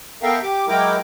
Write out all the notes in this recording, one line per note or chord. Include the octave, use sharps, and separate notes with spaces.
B3 A4 A#4 E5 F5 G5
G4 D6
F#3 G#3 E4 A#4 G5 D6